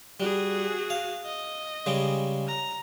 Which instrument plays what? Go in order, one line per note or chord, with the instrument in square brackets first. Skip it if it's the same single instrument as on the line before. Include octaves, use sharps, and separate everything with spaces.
[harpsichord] G3 [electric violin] F#4 G#4
[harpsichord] F5
[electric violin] D#5
[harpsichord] C#3 G3 G#3
[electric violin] A#5